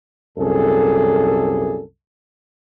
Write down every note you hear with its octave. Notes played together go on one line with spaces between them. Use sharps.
C2 F#2 A#2 G#4 A4